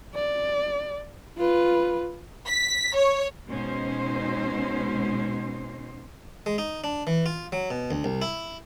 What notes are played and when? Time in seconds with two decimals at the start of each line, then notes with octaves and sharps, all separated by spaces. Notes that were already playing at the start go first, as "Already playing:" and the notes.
0.14 D5
1.38 F4 B4
2.47 B6
2.96 C#5
3.48 B2 G#3 C#4 D#4 C5
6.46 G#3
6.58 D#4
6.84 D4
7.07 E3
7.26 F4
7.52 F#3
7.71 B2
7.91 D2
8.04 C2
8.22 E4